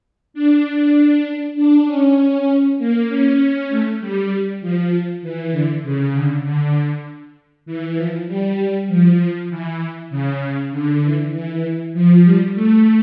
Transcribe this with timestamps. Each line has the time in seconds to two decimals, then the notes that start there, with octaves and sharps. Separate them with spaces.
0.34 D4
0.65 D4
1.56 D4
1.86 C#4
2.79 A#3
3.09 C#4
3.69 A3
4.00 G3
4.61 F3
5.22 E3
5.52 D3
5.83 C#3
6.14 D3
6.44 D3
7.66 E3
7.96 F3
8.27 G3
8.58 G3
8.88 F3
9.19 F3
9.50 E3
10.10 C#3
10.40 C#3
10.72 D3
11.01 E3
11.32 E3
11.94 F3
12.24 G3
12.55 A3